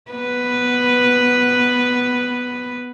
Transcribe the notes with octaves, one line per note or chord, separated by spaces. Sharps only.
B3 B4